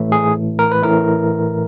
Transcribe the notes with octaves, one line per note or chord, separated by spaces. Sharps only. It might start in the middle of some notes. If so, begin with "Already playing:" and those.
Already playing: A1 A2 E3 A3
G#4
A#4
B4
A1 A2 E3 A3 A#4